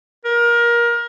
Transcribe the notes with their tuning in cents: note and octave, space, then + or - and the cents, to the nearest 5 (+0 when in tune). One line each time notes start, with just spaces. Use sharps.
A#4 +25